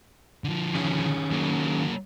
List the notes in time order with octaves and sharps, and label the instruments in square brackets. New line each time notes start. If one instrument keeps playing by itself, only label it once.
[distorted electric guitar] D3 F3
[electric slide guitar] D#3 C#4 G#4
[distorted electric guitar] F#3 A#3